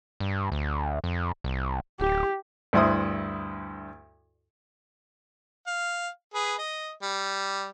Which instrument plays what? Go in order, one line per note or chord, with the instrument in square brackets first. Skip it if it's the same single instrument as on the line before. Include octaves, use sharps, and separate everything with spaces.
[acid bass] G2
D2
F2
C2
[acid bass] D1 [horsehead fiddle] G4
[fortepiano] D2 G2 E4 C5 D#6
[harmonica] F5
G#4 B4
D#5
G3